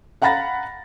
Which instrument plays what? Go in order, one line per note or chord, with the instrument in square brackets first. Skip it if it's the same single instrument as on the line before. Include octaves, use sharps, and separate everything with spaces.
[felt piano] F5 F#5 A#5 B5 A6 A#6